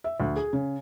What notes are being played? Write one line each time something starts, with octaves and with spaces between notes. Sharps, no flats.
E5
D2
G#4
C#3